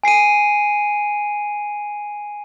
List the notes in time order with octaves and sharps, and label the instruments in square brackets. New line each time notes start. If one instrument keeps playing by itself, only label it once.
[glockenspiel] G#5 C7 D7 D#7